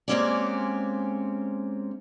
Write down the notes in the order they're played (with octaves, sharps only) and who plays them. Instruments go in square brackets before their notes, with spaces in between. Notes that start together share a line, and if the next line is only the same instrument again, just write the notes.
[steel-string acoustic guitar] G#3 A#3 C4 C#4 G4 D5